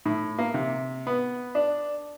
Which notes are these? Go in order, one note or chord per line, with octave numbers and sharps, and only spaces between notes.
A2
A#3
C3
B3
D4